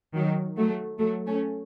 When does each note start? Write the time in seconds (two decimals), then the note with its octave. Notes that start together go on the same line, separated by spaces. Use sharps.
0.14 D#3 F#3
0.57 F#3 A3
0.99 F#3 A3
1.27 A3 C#4